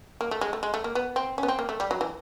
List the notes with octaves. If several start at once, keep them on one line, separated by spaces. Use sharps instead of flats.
A#3
A3
G#3
A3
G#3
A3
A#3
B3
C4
C#4
B3
C4
A#3
A3
G3
F#3
E3